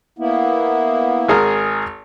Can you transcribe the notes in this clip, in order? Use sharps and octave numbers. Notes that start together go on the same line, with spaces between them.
A#3 B3 E4
G#1 G#4 A#4